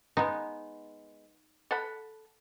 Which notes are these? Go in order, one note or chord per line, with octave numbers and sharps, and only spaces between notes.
G#3 B3 D#4
A4 F#5 B5